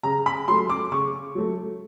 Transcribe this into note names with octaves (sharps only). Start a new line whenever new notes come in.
C#3 A#5
B5
F#3 A3 C6
D6
C#3 C#6
F#3 A3